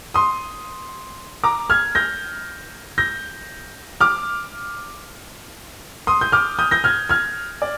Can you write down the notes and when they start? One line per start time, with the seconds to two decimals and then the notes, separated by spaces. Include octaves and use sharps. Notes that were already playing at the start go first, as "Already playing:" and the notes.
0.14 C6 D#6
1.44 A#5 D6
1.70 F6 G#6
1.95 G6 A#6
2.98 G6 A#6
4.01 D6 F6
6.07 C6 D#6
6.21 G6
6.32 D6 F6
6.59 D#6 G6
6.71 G6 A#6
6.84 F6 G#6
7.09 F6 G#6
7.62 D5